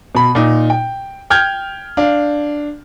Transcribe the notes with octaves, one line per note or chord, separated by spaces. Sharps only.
B2 B5
A#2 D#4
G5
G5 F6 G6 G#6
D4 F5